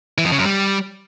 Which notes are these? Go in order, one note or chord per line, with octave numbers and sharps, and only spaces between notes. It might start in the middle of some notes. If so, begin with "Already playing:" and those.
E3
F2
C#3
F#2
G3